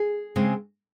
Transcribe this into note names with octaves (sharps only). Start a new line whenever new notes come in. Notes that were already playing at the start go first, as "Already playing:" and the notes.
Already playing: G#4
C#3 G#3 C4